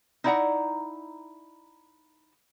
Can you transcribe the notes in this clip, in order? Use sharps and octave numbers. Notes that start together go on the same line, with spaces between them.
D#4 E4 D5 E5 F#5 A#5